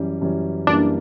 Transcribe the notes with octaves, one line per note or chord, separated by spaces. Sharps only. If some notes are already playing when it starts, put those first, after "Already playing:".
Already playing: F#2 E3 G3 C#4
F#2 E3 G3 C#4
F#2 E3 G3 A#3 D4